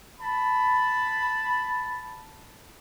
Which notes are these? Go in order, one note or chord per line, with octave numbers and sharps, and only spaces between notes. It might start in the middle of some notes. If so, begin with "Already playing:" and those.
A5 B5